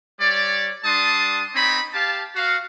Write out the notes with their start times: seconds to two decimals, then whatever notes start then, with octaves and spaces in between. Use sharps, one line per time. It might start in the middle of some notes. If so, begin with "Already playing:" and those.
0.20 G3 C#5 D5
0.84 G3 D4 A5 C6 D#6
1.55 C4 D#4 C#5 B5
1.94 G4 F5 A5
2.35 F#4 F5